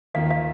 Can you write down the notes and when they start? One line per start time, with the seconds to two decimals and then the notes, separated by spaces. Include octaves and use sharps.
0.14 D#2 D#3 A#3 F4 F5
0.31 F5